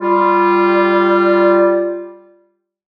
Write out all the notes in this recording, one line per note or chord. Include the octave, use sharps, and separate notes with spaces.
G3 F4